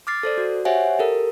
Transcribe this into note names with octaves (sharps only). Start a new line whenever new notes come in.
D6 F6 A6 C7
A4 C5 D5
F#4
G4 C5 C#5 E5 F#5 G#5
G4 A4 A#4